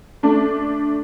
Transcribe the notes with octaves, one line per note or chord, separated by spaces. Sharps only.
A3 D4